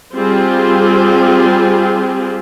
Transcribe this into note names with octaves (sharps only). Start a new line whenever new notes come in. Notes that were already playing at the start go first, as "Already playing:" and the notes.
G3 C4 F4 G4 G#4